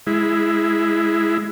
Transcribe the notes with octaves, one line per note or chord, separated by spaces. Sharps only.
G#3 E4